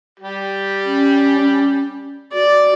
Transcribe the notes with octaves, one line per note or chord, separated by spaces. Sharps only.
G3 G4
C#4
F#4 D5